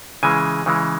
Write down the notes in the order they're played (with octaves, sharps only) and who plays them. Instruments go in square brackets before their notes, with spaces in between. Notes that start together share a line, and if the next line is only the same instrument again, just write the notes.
[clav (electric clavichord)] C#3 E3 G#3 G#5
C#3 E3 G#3